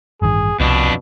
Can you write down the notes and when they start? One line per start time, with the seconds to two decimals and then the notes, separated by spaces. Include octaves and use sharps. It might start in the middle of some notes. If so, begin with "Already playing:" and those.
0.22 A1 G2 D#3 G#4
0.60 C2 F2 B2 D4